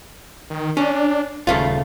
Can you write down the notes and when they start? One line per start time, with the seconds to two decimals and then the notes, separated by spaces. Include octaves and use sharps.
0.50 D#3
0.77 C#4 D4
1.47 D#1 C#3 A3 F4